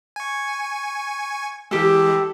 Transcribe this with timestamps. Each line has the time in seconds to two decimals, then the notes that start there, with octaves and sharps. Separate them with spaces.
0.16 G#5 C#6
1.71 E3 G#3 G4 A4